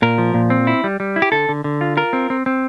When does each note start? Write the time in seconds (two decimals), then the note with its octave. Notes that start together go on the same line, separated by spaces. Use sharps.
0.02 A#2 A#4
0.18 F3
0.34 A#2
0.50 C4
0.67 E4
0.84 G3
1.00 G3
1.16 E4
1.22 G4
1.32 D3 A4
1.49 D3
1.64 D3
1.81 F4
1.97 F4 A#4
2.13 C4
2.30 C4
2.46 C4